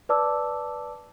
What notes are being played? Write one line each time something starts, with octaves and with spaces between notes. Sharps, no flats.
B4 D5 A5 D6 E6